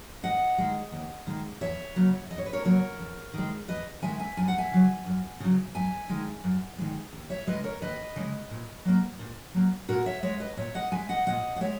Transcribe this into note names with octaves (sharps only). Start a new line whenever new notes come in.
D#2 D#5 F#5
D#3 G#3
D#2
D#3 G#3
E2 C#5 E5
C#3 F#3 A#3
E2 D#5
C#5
B4
A#4 C#5
C#3 F#3 A#3 A#4 C#5
E2
D#3 G#3
E2 B4 D#5
D#3 G#3 E5 G#5
E5 G#5
F#2 G#5
F#5
E5 G#5
C#3 F#3
F#2
C#3 F#3
F#2 E5 G#5
D#3 G#3
F#2
D#3 G#3
D#2
C#5 E5
C#3 G#3 B4 D#5
A#4 C#5
D#2 B4 D#5
C#3 G#3
A#2
F#3 A#3
A#2
F#3 A#3
A#2 F#4 A#4
C#5 E5
G#3 C#5 E5
B4 D#5
A#2 C#5 E5
D#5 F#5
G#3 E5 G#5
D#5 F#5
A#2 D#5 F#5
F#5
G#3 C#5 E5